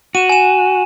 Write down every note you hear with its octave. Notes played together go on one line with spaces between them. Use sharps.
F#4 D#7 E7
G#5 E7